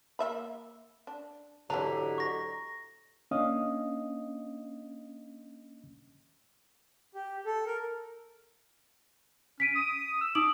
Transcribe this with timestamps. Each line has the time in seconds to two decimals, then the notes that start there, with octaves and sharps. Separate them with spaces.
0.19 A#3 E5 B5
1.07 D4
1.70 G#2 D3 E3 F#3 D4 E4 G4 A#5
2.18 C#6 A#6
3.31 A#3 C#4 D4 D#5 F5 D#6
7.15 G4
7.46 A4
7.66 A#4
9.60 C#4 B6 D7 D#7
9.75 D#6
10.21 E6
10.35 D#4 D6 D#6 F#7